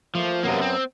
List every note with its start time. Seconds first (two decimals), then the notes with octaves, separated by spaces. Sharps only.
0.15 F3 A3 A#3
0.44 F#2 C3 F#3 A#3 B3
0.62 C4